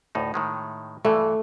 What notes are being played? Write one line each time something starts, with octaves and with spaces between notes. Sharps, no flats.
D2 A2 D#4
A2 D#3 G#3
G2 E3 A3